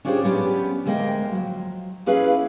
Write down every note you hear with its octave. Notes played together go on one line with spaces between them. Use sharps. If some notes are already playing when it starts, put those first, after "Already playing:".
C#4 D4 F4 G4 G#4 C5
F#3 B3 C#4 D4 G4
D2 G#3 A#3 D#5 F#5 G5
F3 F#3
A#3 C#4 E4 G#4 B4 F5